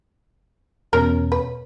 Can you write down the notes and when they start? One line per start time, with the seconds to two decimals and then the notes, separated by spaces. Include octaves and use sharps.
0.93 E2 B2 C#4 A#4
1.32 B4